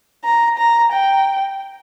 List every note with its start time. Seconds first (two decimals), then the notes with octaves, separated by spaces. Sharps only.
0.25 A#5
0.58 A#5
0.92 G5